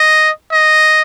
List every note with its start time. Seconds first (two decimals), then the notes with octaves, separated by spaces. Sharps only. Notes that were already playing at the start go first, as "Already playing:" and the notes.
Already playing: D#5
0.52 D#5